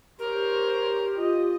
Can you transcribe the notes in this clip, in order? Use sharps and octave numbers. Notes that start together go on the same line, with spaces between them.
G4 A#4 C5 C#5
F4 D#5